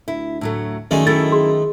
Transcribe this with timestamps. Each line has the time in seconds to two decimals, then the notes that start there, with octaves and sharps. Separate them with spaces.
0.08 D2 E4
0.41 A2 F#3 A3
0.91 F#2 D#3 G#3 A3 D5 G#5
1.07 F#2 E4 A4 G5 A6
1.32 G#4 C6